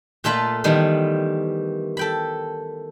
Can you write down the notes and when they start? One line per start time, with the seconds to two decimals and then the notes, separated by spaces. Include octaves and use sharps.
0.24 A#2 A3 F4 A4 B5
0.64 D#3 E3 G3 B3
1.97 A4 G5 B5